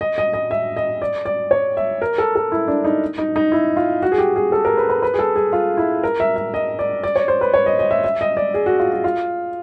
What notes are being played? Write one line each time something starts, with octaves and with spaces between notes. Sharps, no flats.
D#5
D#5
D#5
E5
D#5
D5
D5
C#5
E5
A#4
A4
A4
E4
D4
D#4
D#4
D#4
E4
F4
F#4
G#4
G4
G#4
A4
A#4
B4
B4
B4
G#4
A4
G#4
F4
E4
A#4
E5
E5
D#5
D5
D5
C#5
C5
B4
C#5
D#5
D#5
E5
E5
D#5
D5
G#4
F#4
F4
F#4
F4